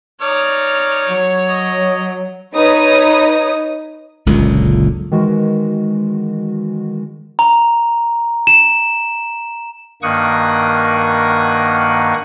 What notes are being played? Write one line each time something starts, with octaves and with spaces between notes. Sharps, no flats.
D#4 C#5 D5 F6
F#3
D#5
D#4 B4 C#5 D#6
F#1 C#2 A#2 D3
D#3 E3 G#3 F#4
A#5
E7
G2 D#3 A#3 F#5 C#6 D#6